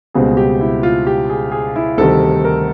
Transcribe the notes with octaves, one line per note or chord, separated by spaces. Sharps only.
C#2 B2 G3 C4 G#4
G4
E4
F4
G4
G#4
G#4
E4
D2 C3 D#3 G3 A4
A#4